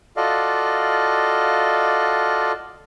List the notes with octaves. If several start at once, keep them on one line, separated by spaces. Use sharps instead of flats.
F4 F#4 A4 D5 D#5 F5